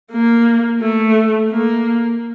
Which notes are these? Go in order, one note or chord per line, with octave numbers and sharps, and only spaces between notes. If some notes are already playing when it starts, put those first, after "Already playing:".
A#3
A3
A#3